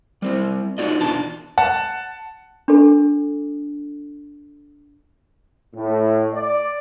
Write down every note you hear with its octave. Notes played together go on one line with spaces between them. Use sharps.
G3 C4 E4
D#4 F4 F#4 D5 D#5
E2 B2 D4 F4 A5 C6
F#5 A5
D4 A4
A2
D5